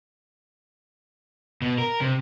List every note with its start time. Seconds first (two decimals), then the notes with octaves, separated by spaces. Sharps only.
1.62 B2
1.78 A#4
2.01 C3